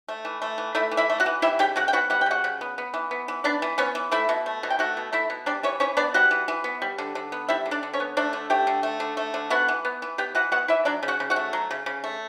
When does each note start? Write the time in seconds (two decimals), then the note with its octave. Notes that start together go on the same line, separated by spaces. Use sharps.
0.08 A3
0.25 E3
0.42 A3
0.58 E3
0.75 A3 E4 E5
0.91 E3
0.97 E4 E5
1.10 A3
1.20 F#4 F#5
1.26 E3
1.42 G3 E4 E5
1.59 C#3 G4 G5
1.76 C#3 F#4 F#5
1.88 G5
1.93 B3 F#4 F#5
2.10 G3 F#5
2.21 G5
2.26 C#3 F#4 F#5
2.44 C#3
2.61 B3
2.78 B3
2.94 E3
3.11 B3
3.28 E3
3.44 B3 D4 D5
3.62 E3
3.78 B3 C#4 C#5
3.95 E3
4.12 A3 E4 E5
4.29 B2
4.46 A3
4.63 B2
4.70 G5
4.79 A3 F#4 F#5
4.97 B2
5.12 A3 E4 E5
5.30 B2
5.46 G3 D4 D5
5.63 E3 C#4 C#5
5.80 E3 C#4 C#5
5.97 B3 D4 D5
6.14 G3 F#4 F#5
6.31 E3
6.48 E3
6.64 B3
6.82 G3
6.98 D3
7.15 D3
7.32 B3
7.49 G3 E4 E5
7.66 D3
7.71 D4 D5
7.83 D3
7.93 C#4 C#5
8.00 B3
8.17 A3 D4 D5
8.33 D3
8.50 A3 G4 G5
8.67 D3
8.83 A3
9.00 D3
9.17 A3
9.34 D3
9.50 B3 F#4 F#5
9.68 E3
9.85 B3
10.02 E3
10.18 B3 G4 G5
10.35 E3 F#4 F#5
10.52 B3 F#4 F#5
10.68 E3 E4 E5
10.85 F#3 D4 D5
11.03 C#3
11.08 F#4 F#5
11.20 C#3
11.30 F#4 F#5
11.36 A3
11.53 F#3
11.71 C#3
11.86 C#3
12.04 A3